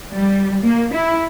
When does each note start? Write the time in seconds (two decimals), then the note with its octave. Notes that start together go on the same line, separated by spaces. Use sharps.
0.14 G3
0.63 A#3
0.93 E4